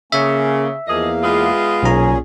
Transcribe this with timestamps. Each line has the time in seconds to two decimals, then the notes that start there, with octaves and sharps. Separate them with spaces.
0.12 C#3 A#3 C#4 E5
0.88 E2 F3 A#3 G#4 D#5 F5
1.22 G#3 B3 F4
1.83 B1 A#2 C#4 G#4 A#5